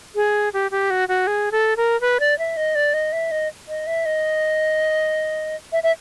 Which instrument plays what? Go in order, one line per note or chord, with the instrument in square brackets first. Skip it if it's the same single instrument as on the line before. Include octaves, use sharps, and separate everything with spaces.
[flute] G#4
G4
G4
F#4
F#4
G#4
A4
A#4
B4
D5
E5
D#5
D5
D#5
E5
D#5
D#5
E5
D#5
E5
E5